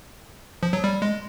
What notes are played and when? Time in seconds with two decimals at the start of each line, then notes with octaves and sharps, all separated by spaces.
0.63 F3
0.73 F#3
0.84 G3
1.02 G#3